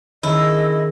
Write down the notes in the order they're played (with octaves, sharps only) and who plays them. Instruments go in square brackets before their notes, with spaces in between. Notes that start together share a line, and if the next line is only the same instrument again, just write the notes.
[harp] D#3 C#4 G#4 [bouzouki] E4 [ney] D#5 [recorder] E6